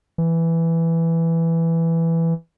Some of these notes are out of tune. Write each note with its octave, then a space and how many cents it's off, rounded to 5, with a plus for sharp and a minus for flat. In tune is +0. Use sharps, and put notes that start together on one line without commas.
E3 +5